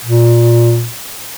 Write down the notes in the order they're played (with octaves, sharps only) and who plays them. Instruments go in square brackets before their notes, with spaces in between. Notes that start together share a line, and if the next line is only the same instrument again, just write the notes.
[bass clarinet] A#2